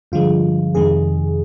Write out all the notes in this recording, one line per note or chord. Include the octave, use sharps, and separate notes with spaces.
G2 D3 F3 G#3 F4
F2 C3 D#3 G#3 G#4